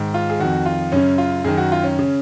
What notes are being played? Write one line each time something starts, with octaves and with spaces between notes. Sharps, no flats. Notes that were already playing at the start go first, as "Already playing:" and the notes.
Already playing: G#2 D#3
F4
G#4
F2 D#3 F#4
F4
F#2 C#3 C#4
F4
F#2 D#3 G#4
F#4
F4
C#4
C#3